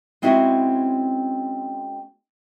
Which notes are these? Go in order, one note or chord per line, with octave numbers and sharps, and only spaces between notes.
G#3 C4 C#4 E4 F#4